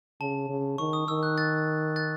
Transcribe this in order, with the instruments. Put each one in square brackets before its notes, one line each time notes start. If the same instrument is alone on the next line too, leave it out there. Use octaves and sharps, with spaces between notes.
[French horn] C#3 [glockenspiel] A5
[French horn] C#3
[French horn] D#3 [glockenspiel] C#6
[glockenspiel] D#6
[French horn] D#3 [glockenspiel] E6
[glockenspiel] F#6
F#6 A6
F#6 A6